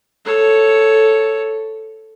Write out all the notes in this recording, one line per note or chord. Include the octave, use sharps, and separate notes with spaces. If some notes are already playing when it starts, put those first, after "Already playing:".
A4 C#5